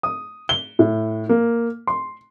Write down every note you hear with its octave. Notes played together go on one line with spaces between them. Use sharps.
D#6
G7
A2
A#3
C6